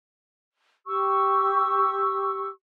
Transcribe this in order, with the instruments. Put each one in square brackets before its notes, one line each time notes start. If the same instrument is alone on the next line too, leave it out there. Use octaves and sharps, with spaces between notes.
[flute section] G4 C#6 E6